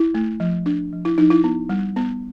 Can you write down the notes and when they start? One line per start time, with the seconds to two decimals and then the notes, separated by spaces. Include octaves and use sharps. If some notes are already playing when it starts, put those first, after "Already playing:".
Already playing: E4
0.14 A3
0.40 F3
0.66 D4
0.93 F3
1.05 E4
1.18 F3 D#4
1.30 E4
1.44 B3
1.69 G3
1.96 B3